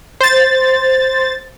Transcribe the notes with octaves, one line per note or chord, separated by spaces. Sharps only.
C5 A6